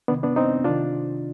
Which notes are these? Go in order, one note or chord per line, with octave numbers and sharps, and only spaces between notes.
C3 D#3 B3 D4
B3 D4
C4 D#4
C3 D#3 D4 F4